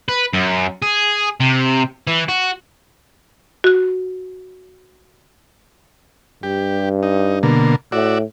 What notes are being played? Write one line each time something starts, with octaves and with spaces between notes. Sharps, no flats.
B4
F#2
G#4
C3
E3
F#4
F#4 F#6
G2 G4
D#4
B2 D3 A#3
A2 F#4 D5 E5